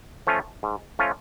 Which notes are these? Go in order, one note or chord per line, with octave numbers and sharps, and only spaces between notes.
F3 A3 C#4 F4
G#2
F3 A3 C#4 F4